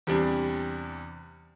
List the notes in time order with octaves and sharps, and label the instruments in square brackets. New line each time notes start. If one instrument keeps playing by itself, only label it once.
[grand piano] E2 C3 G3 D4